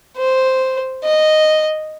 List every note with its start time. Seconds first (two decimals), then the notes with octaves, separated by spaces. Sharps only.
0.17 C5
1.04 D#5